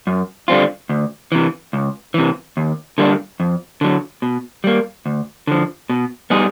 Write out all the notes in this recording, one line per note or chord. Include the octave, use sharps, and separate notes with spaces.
F#2
D3 G3 C4 F4
D2
C3 E3
C#2
C3 E3
D#2
D3 G3 A#3 D4
F2
D3 F#3
B2
G3 A#3
D2
D3 F3
B2
G3 B3 D#4 G#4